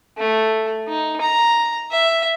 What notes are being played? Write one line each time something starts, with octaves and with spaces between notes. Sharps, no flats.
A3
D#4
A#5
E5